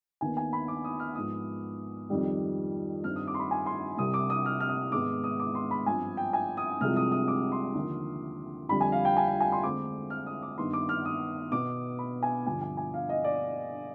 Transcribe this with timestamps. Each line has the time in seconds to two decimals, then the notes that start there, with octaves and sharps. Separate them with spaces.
0.21 D#2 D#3 B3 G#5
0.37 G#5
0.53 B5
0.68 D6
0.84 D#6
1.00 F6
1.15 G#2 F3 B3 D#6
2.10 F2 D#3 G3
3.04 G2 D#3 G3 C4 F6
3.16 D#6
3.27 D6
3.34 C6
3.39 B5
3.51 G#5
3.66 C6
3.97 C2 C3 G3 D#6
4.14 D6
4.30 D#6
4.46 F6
4.60 F6
4.69 D#6
4.92 G#2 D#3 G#3 B3 D6
5.24 D#6
5.40 D6
5.55 C6
5.71 B5
5.86 G2 F3 C4 G#5
6.17 G5
6.33 G#5
6.57 D#6
6.81 C2 C3 F3 G#3 F6
6.96 D#6
7.12 D#6
7.28 D6
7.52 C6
7.75 D#2 D3 F3
8.69 F2 D3 G3 B5
8.81 G#5
8.92 F5
9.05 G5
9.17 G#5
9.28 G5
9.41 G#5
9.52 C6
9.63 D2 D3 G#3 C4 D6
10.10 F6
10.26 D#6
10.42 D6
10.58 G2 D#3 B3 C6
10.73 D6
10.89 F6
11.05 D#6
11.52 B2 B3 D6
11.99 B5
12.23 G#5
12.46 G2 D3 F3 G#5
12.61 G#5
12.77 G#5
12.94 F5
13.09 D#5
13.24 D5